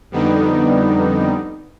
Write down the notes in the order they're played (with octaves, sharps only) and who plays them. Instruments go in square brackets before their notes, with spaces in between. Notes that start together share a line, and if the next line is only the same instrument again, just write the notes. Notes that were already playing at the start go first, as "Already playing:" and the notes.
[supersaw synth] F2 D3 G3 B3 D#4